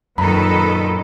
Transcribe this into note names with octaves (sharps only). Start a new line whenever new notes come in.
F#2 A#2 D#3 A4 B4 A#5 B5